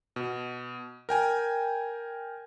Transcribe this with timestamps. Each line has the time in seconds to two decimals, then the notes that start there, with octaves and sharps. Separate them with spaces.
0.16 B2
1.09 A#4 G5 G#5